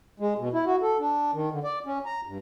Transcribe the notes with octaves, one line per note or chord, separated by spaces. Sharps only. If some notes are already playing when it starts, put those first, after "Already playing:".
G#3
B2
E4
F#4
A4
D4
D#3
D3
D5
C#4
A#5
G2